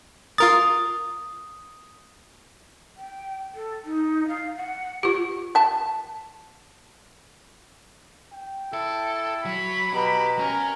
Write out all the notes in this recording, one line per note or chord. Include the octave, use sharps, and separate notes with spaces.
F4 A#4 D#6 A6
G5
A4
D#4
F5
F#5
F4 G4
E5 A5
G5
E4 A4
F#3 B5
B2 G4 A#5
C#4 A#4